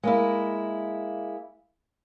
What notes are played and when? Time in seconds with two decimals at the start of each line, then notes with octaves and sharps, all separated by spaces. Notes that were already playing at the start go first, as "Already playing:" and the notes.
0.03 G#3 A#3 E4